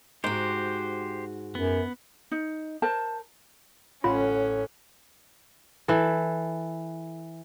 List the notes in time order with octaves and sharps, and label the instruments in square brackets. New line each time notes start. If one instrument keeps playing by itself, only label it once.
[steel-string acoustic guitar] G#2 F#4 [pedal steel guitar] G4 C5
[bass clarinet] F#2 [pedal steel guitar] B3
[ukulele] D#4
A#4 C5 A5
[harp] A1 F#5 [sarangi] C#4 [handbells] F4 B5
[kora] E3 A4